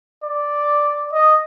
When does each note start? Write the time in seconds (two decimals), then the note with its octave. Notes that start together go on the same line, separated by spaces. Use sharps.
0.23 D5
1.13 D#5